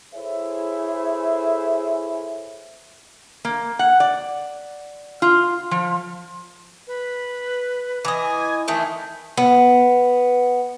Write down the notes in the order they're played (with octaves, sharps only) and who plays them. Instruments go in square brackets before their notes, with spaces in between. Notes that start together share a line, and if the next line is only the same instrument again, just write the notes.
[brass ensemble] E4 G#4 A4 C5 C#5 E5
[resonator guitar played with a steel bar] A#3
F#5
D5
F4
F3
[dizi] B4
[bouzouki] E3 D#5 [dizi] G#5
[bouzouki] D#3 E3 A3 [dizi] G6
[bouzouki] B3